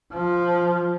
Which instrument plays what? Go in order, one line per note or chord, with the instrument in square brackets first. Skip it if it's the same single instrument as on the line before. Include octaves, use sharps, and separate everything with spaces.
[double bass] F3